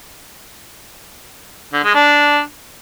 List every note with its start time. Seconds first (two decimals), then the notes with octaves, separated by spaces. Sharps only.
1.73 D3
1.84 G#3
1.95 D4